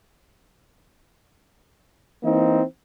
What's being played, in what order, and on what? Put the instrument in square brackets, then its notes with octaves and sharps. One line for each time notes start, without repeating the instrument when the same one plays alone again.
[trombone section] E3 A#3 C4 D#4